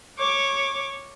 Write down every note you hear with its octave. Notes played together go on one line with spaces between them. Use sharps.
C#5 D6